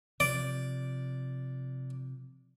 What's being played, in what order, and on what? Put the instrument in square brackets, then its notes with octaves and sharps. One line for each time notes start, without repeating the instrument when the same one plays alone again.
[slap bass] C3 F3 [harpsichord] D5